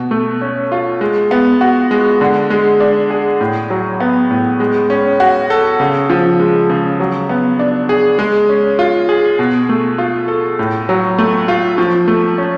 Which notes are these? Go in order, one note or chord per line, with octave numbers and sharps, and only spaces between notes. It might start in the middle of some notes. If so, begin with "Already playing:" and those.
Already playing: B2
A3
C#4
F4
G#3
B3
F#4
G#3
D3
G#3
D4
G#4
A2
F#3
B3
A2
G#3
C#4
F#4
A4
C#3
F3
G#3
C#3
F#3
B3
D4
G#4
G#3
C#4
F4
G#4
B2
A3
F4
A4
A2
F#3
A3
F4
F3
A3
C#4